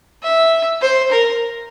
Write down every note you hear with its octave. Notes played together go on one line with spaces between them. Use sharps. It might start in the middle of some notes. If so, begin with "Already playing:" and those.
E5
C5
A#4